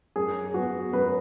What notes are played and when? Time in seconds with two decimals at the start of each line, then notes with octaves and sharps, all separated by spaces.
0.16 F#2 G#4
0.54 F#3 B3 F#4
0.93 F#2 B4